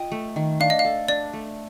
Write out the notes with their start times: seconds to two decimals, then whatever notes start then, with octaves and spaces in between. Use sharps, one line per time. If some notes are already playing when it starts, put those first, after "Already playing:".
Already playing: F4 D#5 G5
0.12 A3
0.36 D#3
0.60 D4 F5
0.70 D#5
0.79 F5
0.85 A4
1.08 D4 D5
1.33 A3